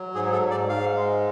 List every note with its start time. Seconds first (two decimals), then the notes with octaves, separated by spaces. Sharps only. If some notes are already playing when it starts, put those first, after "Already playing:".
Already playing: F#3
0.15 G#2 G#4
0.32 A4
0.41 G#2
0.51 D5
0.69 G#2 F5
0.96 G#3